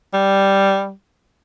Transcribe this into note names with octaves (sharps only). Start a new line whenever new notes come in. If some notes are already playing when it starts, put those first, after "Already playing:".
G3